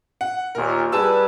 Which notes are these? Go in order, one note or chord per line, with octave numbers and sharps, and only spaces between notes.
F#5
D#2 A#2 A#4
G3 G#4 B4 A5 E6